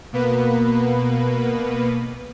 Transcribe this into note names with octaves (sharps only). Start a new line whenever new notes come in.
B2 A#3 B3 B4